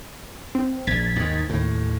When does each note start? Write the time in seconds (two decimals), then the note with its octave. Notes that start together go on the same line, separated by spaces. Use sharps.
0.55 C4
0.87 A#1 G#6 A6 B6
1.16 D#2 G#2 D#3
1.49 D#2 A2